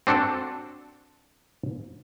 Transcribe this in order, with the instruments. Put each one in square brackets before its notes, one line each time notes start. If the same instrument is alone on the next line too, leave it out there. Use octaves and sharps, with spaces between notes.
[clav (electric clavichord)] C4 D4 F#4 A4